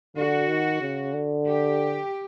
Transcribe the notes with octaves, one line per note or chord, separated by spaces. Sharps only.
D3 F#4
D#3
C#3
D3
G4